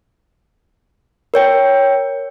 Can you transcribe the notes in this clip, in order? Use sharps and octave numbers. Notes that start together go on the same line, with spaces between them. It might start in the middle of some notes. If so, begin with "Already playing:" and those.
A#4 C#5 G5